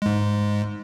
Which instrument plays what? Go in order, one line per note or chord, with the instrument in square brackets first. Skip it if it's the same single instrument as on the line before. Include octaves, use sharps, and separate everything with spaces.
[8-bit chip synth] G#2 G#3